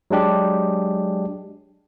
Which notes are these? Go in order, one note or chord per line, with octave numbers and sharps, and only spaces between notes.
F#3 G#3 D4 G4